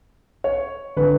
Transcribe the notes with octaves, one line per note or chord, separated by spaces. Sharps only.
C#5
D3 B4